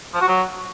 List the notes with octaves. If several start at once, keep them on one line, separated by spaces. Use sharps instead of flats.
F3
F#4
F#3